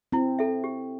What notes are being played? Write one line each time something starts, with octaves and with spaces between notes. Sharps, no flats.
C4 E4
A4 E5
G4